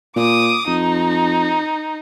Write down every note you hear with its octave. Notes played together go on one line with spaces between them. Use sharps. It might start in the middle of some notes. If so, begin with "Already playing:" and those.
A#2 D6 D#6
F2 D#4